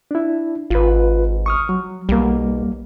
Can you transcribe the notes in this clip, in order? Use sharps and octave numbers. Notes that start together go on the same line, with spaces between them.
D4 E4
G#1 F4 B4
C#6 D#6 F6
F#3
B1 G3 A#3